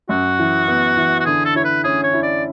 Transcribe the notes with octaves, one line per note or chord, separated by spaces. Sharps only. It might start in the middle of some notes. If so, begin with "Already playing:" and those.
F#2 F#4
E3
B3
E3
F#4
D3 G#4
A4
E4 C#5
B4
C#4 G#4
C#5
E4
D5